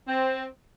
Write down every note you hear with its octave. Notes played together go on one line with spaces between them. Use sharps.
C4